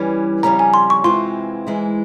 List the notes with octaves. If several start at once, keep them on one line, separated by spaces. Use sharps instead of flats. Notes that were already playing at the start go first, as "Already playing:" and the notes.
Already playing: G2 E3 G3 C#4
F2 C#3 G3 C#4 A#5
G#5
C6
C#6
C3 E3 G#3 C4 F4 C6
G#2 E3 G#3 E4